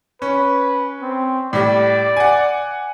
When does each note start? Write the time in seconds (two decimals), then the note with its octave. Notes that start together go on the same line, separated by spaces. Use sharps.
0.22 C#4 B4
1.02 C4
1.53 A2 G3 D5
2.17 F#5 G#5